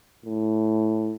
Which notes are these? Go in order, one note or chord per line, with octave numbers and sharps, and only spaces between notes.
A2